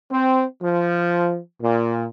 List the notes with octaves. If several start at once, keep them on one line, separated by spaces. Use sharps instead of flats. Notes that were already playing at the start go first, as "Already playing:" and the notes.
C4
F3
A#2